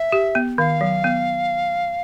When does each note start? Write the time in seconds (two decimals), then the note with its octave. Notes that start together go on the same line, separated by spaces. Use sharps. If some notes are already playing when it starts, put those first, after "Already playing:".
Already playing: E5
0.12 G4
0.35 B3
0.58 D#3 F5
0.81 F#3
1.04 B3